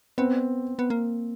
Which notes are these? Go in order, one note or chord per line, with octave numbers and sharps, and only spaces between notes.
B3 C4
B3
A#3